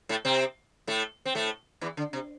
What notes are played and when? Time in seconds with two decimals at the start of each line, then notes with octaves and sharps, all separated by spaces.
0.09 A2 A3
0.25 C3 C4
0.87 A2 A3
1.25 C4
1.35 A2 A3
1.81 E2 E3
1.97 D3
2.13 C3